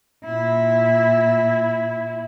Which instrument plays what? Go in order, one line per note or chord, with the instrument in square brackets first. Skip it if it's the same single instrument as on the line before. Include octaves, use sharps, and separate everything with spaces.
[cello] A#2 E4